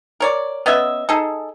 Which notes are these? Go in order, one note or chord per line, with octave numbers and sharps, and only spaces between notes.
A#4 C#5 D5
B3 C#4 D#5 E5
D#4 G#4 A4